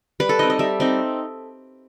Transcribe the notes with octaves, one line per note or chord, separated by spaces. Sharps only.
G3 B4
A4
C4 D#4 D#5
D#5
G3 E5
C4 D#4